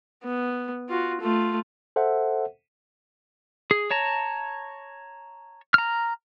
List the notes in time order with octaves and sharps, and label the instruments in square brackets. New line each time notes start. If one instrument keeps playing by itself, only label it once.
[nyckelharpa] B3
F4 F#4
A3 F4
[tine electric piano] A4 C5 E5 F#5
[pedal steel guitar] G#4
C#5 A5 A#5
A#5 F6